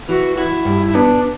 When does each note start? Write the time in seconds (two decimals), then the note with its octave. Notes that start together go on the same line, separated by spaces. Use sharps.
0.09 E3 F#4
0.37 E4 F#4
0.65 G2
0.86 E4
0.95 B3 D4